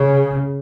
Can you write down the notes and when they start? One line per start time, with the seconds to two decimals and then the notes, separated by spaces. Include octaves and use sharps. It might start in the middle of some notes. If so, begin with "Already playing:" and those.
Already playing: C#3